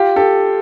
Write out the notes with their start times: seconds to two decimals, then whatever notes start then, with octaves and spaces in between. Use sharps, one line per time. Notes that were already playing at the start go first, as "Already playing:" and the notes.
Already playing: F4 G4
0.16 G4 A4